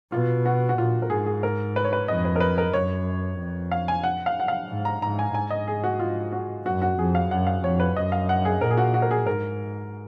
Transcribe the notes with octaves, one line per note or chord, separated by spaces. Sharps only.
B2 F4
F#4
F#4
A#2 F4
A#4
G#2 G#4
G#4
A#4
B4
C#5
B4
F2 D#5
B4
A#4
B4
A#4
F#2 C#5
F2
F5
G#5
F#5
F5
F#5
F5
G#2
A#5
G#2 A#5
G#5
G#2 G#5
D#5
G#4
F#4
F4
F#4
F#2 F#4
F#4
F2 G#4
F5
F#2 F#5
F5
F2 C#5
B4
F#2 D#5
F5
F#5
G#4
A#2 A#4
G#4
F#4
F#4
A#4
G#4
G#2 A#4